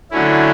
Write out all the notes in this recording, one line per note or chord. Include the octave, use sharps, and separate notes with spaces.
D3 F#3 A3 C#4 E4